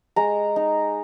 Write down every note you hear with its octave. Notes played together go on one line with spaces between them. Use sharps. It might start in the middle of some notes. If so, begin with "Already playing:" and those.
G#3 A#5
D#4